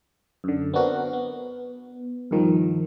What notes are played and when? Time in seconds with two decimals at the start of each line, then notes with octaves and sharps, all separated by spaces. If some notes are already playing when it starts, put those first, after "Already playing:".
0.44 F#2 D3
0.74 B3 C4 D4 F#4 A#4
1.13 B3
2.31 G2 D#3 F3